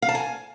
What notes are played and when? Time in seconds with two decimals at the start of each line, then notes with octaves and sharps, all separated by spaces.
0.02 F5
0.09 A5
0.15 G#5